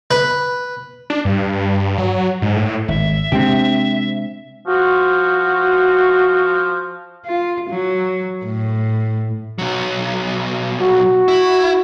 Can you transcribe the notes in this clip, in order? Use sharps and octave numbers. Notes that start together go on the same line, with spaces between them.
B4
D4
G2
F#3
G#2
A2
G#1 E5
C3 G#3 C4 D4 G4
F3 F#4
F4
F#3
A2
B1 F#3
F#4
E4